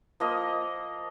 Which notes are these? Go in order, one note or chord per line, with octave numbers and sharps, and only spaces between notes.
F3 A#3 D#5